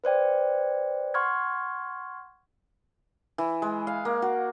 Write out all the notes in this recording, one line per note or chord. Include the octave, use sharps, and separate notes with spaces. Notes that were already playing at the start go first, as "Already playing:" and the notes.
B4 C5 D5 G5
F#5 C6 C#6 F6 G#6
E3
G#3
F5
A#3
F#4